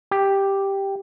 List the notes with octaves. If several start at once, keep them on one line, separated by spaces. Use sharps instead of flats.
G4